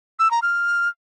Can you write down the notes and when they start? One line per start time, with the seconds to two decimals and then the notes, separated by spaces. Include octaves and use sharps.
0.19 E6
0.31 A#5
0.42 F6